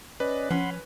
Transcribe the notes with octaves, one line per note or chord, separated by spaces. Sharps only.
C#4 B4 D5 D#5
F3 C#4 F#5 B5 C6